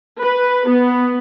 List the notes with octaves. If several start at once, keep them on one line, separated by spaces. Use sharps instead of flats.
B4
B3